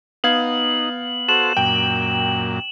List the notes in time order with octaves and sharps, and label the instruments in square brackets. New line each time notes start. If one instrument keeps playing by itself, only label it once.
[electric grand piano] B3 F5 G#6 [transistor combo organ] D#4 [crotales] F#7
[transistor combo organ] F#4 A4 C5 [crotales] E7 F#7
[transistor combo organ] F#2 A#2 [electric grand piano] G5